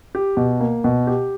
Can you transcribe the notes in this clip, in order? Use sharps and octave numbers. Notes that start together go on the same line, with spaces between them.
G4
B2
A#3
B2
G4